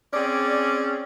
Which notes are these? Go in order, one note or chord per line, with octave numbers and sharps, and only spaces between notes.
C4 C#4 G#4 D5